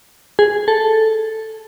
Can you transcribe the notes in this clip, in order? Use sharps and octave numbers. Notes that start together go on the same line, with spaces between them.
G#4
A4